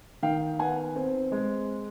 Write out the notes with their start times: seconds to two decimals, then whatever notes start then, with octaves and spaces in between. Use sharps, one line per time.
0.23 D#3 F5 G5
0.59 B3 F#5 G#5
0.96 C4
1.32 G#3